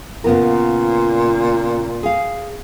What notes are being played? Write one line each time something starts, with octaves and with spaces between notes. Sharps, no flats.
A#2 C#3 B3 A#4
G#4 F5